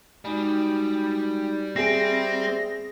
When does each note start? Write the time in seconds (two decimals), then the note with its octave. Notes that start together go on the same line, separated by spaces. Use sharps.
0.25 G3 G#3 D#4 F#4
1.76 C4 G#4 E5 A#6